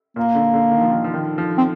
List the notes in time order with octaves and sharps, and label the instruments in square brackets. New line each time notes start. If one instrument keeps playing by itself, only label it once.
[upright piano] A#2 [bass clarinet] A#3
[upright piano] D3
D3
D#3
F3
D#3
F3
D#3
F3
[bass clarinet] C4